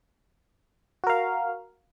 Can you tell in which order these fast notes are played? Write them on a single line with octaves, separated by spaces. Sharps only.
F#4 A#4 F5